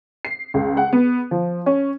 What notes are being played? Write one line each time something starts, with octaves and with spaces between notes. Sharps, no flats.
C7
C#2
F#5
B3
F3
C#4